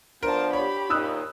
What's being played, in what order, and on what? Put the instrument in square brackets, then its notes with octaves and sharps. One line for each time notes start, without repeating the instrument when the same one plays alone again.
[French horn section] F3 B3 D4 [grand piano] A#4 [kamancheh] C5 A5
[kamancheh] G4 B5 [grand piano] C#5
[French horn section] D#2 A#2 D#4 [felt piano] D#6 E6 F#6